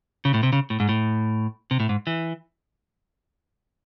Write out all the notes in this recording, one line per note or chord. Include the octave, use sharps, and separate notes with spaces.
C#3
A2
C3
C#3
A2
G#2
A2
C3
A2
G#2
E3